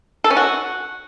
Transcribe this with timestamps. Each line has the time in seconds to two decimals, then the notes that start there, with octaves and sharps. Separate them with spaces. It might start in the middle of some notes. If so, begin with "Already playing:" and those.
0.24 A4
0.30 C#4
0.37 F#4